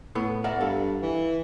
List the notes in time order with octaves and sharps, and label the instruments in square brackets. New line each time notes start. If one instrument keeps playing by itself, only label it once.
[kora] A2 B3
[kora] A#4 [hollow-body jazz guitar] D5 E5 F#5
[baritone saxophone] G2 [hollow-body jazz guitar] A4 F5
[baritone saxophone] E3